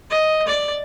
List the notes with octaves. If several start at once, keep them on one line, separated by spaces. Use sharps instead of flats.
D#5
D5